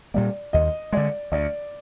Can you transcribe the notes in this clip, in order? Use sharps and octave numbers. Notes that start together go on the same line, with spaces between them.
A#2 G3 A#3 D5
D#2 D#5
D3 G#3 D5
D2 D5